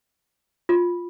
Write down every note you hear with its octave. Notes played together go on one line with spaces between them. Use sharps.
F4